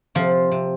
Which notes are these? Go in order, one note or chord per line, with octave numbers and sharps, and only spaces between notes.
C3 F3 F4
C3